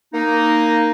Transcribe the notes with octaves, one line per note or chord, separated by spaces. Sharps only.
A#3 D#4